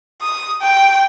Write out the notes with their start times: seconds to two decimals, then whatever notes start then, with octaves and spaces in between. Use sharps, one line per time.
0.22 D#6
0.61 G5